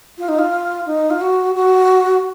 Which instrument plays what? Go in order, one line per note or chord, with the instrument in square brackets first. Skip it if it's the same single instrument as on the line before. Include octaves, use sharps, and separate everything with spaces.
[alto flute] F4
D#4
F4
D#4
F4
F#4
F#4